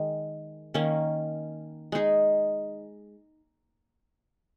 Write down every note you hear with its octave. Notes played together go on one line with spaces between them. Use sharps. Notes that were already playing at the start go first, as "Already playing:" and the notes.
Already playing: D#3 G#3
D#3 A#3 C#4
G#3 D#4 G#4